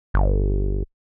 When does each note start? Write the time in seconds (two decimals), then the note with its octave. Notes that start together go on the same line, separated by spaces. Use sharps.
0.14 G1